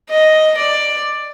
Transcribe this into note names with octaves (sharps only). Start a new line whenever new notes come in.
D#5
D5